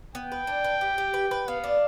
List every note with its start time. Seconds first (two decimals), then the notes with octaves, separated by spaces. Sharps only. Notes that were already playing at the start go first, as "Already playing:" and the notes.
0.15 B3 G5
0.32 B4
0.47 D4
0.64 B4
0.81 G4
0.98 G4
1.14 B4
1.31 B4
1.48 B3 F5
1.64 D4